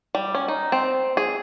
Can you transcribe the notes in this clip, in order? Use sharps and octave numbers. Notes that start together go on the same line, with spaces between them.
G3
C#4
D#4
C4
G#4